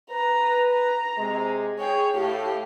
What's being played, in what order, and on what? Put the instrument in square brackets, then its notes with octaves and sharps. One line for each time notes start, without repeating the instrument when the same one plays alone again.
[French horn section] B4 [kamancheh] A#5
[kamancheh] A#5
[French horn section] C3 G#3
[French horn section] G#4 [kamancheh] C#5 G5
[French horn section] A2 [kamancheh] G4 F5